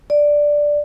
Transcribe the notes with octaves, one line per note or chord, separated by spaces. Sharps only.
D5